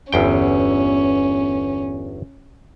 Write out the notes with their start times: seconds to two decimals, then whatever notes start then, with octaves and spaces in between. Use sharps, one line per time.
0.13 G1 E2 C#4 G5